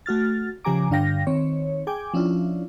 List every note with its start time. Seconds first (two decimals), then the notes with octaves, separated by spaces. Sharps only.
0.06 A3 F#4 F6 A6
0.65 C#3 F3 G4 G#5 A#5 D6
0.90 G2 D3 D4 F5 G5 A#6
1.27 D#3 C4 C#5
1.87 G#4 G5 G#5 D6
2.14 F3 C#4 D4 E4 F4